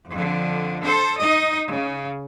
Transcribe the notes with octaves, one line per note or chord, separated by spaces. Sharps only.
F2 D3
A4 C5
D#4 D#5
C#3